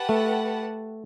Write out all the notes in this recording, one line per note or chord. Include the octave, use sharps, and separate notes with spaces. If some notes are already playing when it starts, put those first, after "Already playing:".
Already playing: G4 B4 F#5 A5
A3